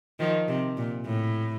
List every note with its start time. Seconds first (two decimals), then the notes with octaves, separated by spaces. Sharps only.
0.19 D#3 F3
0.48 C3
0.77 A#2
1.05 A2